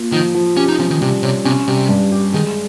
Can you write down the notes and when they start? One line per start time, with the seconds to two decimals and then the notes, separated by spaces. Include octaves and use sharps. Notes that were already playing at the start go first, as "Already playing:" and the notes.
Already playing: A#3 F4
0.12 D#3 F3
0.35 F3
0.57 C#4 G4
0.68 D#4
0.79 F3 C#4
0.90 D#3
1.00 C3 G3
1.22 C3 C#5
1.45 C3 C#4
1.67 C3 G3
1.89 G2
2.12 G4
2.34 D#3 G#3